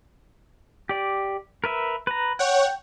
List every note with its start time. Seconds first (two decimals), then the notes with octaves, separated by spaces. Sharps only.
0.89 G4 D5
1.64 A#4 B4 E5
2.07 B4 A#5
2.39 C#5 F#5 G5